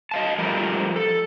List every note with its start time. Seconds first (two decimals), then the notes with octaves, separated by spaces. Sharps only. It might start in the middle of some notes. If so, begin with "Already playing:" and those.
0.11 D#5 F5 A5
0.38 F3 G3 A3 A#4 C5
0.96 A4